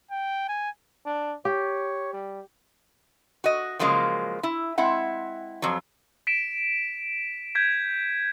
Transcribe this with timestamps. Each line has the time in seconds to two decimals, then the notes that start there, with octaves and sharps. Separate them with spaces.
0.11 G5
0.49 G#5
1.06 D4
1.45 G4 C#5
2.13 G3
3.44 F#4 D#5
3.79 C#3 F3 F#3 G#3 A#3
4.43 E4
4.78 G#3 C4 E4 F#5
5.62 F2 F#3
6.27 B6 D7 E7
7.55 G6 G#6 B6